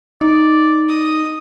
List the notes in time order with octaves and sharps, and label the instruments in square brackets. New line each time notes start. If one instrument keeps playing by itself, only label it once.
[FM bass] D#4 [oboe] D5
[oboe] D#5 [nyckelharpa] D#6